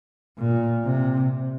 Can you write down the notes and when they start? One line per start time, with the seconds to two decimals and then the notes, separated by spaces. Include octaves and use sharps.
0.38 A#2
0.85 C3